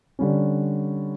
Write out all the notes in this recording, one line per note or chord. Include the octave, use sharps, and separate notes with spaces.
D3 G3 C#4